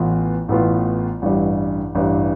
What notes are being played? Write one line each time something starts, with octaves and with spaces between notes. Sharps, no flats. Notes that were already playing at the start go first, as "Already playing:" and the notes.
Already playing: A1 A2 E3 B3 F4
A1 A2 E3 B3 F4
A1 G2 E3 G3
A1 G2 E3 G3